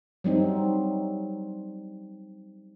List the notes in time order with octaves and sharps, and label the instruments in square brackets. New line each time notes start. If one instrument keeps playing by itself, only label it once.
[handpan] F#3 G3 C4 D#4